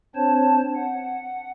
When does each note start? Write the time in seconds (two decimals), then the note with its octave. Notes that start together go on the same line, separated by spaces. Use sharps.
0.15 C4 D4 C5 C#5 A5
0.76 F#5